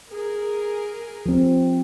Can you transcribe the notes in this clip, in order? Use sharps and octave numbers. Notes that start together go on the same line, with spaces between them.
G#4 A#4
F3 C4